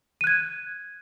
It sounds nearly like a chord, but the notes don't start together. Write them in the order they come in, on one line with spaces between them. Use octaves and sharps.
D#7 F#6 G#6